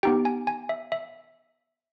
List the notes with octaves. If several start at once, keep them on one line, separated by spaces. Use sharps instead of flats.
B3 D#4 G4 G5
G#5
G#5
E5
E5